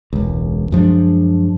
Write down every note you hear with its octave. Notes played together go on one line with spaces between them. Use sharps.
E1 C#2
F#2 F3 G#3 D4